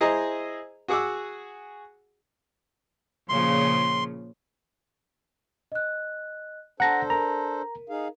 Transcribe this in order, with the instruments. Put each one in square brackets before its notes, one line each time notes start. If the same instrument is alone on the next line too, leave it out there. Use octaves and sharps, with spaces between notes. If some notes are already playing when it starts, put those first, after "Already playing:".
[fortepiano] E4 G#4 C5 D#5 A#5
F#4 G#4 F#5 D6 E6
[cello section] A#2 C#3 F3 [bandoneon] C6
[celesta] D#5 F#6
[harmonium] D4 A4 C5 [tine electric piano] F#5 A#6 [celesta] A5 A#5
[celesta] A#4 [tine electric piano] A#5
[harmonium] D#4 G#4 F5